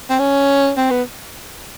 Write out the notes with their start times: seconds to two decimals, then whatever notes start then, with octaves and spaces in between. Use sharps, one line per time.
0.10 C4
0.19 C#4
0.77 C4
0.91 B3